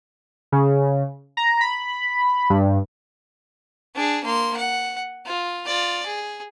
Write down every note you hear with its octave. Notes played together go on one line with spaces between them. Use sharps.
C#3
A#5
B5
G2
D4 G#4
A#3 C6
F#5
F4
F4 D5
G#4